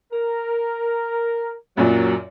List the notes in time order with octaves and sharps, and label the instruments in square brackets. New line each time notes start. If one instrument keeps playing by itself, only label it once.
[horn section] A#4
[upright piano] F#2 A#2 [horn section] F#3